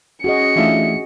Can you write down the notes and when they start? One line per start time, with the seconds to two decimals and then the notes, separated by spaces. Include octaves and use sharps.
0.24 C#4 F#4 G#4 D#5 C#7
0.56 E3 A3 D4 E4 F4